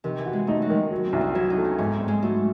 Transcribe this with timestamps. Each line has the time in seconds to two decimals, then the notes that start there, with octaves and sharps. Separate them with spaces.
0.04 C3 D#3
0.18 E3
0.26 F#4
0.33 G#3
0.47 A3 D#4
0.62 F#3
0.70 D#3 G#3
0.91 F#3
1.06 C4
1.13 C2
1.21 C4
1.35 F#3 E4
1.50 D#4
1.57 A3
1.65 C#4
1.78 G#2 C#4
1.93 C4
2.01 G#2
2.08 G#3
2.22 F#3 A3